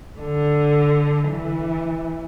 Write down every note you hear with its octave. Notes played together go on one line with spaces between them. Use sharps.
D3
E3